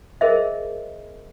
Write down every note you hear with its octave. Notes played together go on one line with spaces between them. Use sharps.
G#4 A#4 C5 D#5 E5